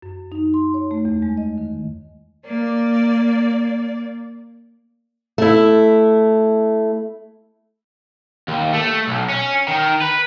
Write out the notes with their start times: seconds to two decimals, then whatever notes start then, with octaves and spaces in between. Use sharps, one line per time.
0.02 F#2
0.32 D#4
0.54 C6
0.74 C#5
0.91 A3
1.05 E2
1.22 G#3
1.37 D#5
1.58 D#3
2.44 A#3 D5
5.38 A3 E4
8.48 D#2
8.73 A3
9.07 B1
9.29 C#4
9.68 D#3
10.02 B4